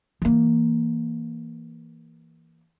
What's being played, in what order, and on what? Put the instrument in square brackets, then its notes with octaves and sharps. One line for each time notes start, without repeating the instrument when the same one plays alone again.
[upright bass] E3 A#3